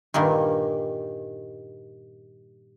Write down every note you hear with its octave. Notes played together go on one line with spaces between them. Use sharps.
G2 A#2 D#3 A#4